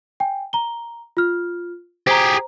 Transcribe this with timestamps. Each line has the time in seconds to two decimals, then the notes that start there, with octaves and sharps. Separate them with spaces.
0.20 G5 G#5
0.53 A#5 G7
1.17 F4 F6
2.07 G4 G#4 C5 A#5